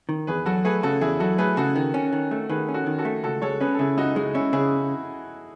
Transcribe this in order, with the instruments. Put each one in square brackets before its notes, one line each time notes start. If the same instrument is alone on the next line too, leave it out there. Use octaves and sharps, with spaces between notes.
[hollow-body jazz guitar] D#3
[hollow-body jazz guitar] E2 [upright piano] G#4 B4
[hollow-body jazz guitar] F#3 [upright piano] F#4 A4
[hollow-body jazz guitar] A3 [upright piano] G#4 B4
[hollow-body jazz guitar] C#3 [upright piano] F#4 A4
[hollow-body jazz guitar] E2 [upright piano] E4 G#4
[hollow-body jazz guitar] F#3 [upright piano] F#4 A4
[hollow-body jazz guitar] A3 [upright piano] G#4 B4
[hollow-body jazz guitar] C#3 [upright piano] F#4 A4
[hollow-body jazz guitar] D#3
C#4
D#3
A3
[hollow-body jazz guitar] D#3 [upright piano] G#4 B4
[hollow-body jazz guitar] C#4
[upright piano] F#4 A4
[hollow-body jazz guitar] D#3
[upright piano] F#4 A4
[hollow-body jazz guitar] A3
[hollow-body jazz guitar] C#2 [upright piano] F#4 A4
[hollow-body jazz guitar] G#3 [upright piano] A4 C#5
[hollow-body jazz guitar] C#4 [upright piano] G#4 B4
[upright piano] A4
[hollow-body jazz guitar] C#3 [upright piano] E4 G#4
[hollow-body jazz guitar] C#2 [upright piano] D#4 F#4
[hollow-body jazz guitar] G#3 [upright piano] D#4
[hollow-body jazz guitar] C#4 [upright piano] E4
[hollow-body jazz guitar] C#3 [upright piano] E4 G#4